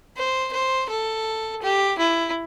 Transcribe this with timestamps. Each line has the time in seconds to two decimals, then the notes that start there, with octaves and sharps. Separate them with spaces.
0.17 C5
0.52 C5
0.89 A4
1.62 G4
1.98 E4